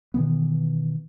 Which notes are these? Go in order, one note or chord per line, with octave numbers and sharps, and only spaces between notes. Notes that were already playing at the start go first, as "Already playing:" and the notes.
B2 D#3 E3 B3